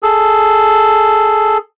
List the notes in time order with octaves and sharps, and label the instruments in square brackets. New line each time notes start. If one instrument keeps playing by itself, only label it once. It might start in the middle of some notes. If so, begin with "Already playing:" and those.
[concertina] G#4 A4